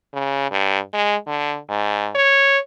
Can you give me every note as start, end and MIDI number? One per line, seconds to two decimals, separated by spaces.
0.14 0.49 49
0.52 0.79 43
0.94 1.16 56
1.28 1.58 50
1.70 2.10 44
2.15 2.58 73